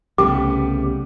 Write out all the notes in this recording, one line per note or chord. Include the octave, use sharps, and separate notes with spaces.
C2 C#3 G3 A3 B3 G4 D6